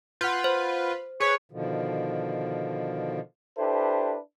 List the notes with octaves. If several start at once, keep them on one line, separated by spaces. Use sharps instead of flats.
F4 B4 F#5 G6
C5
G#4 B4 C#5
B2 D3 D#3 F3
D4 E4 G4 A4 B4 C5